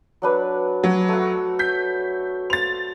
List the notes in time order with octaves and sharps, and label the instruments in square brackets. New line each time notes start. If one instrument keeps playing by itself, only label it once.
[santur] F#3 D4 B4
[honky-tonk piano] F#3
[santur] A3 F#4
[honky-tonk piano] G6 B6
[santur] C5 [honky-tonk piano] A6 F7